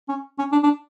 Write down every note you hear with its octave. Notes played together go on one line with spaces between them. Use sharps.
C#4
C#4
D4
D4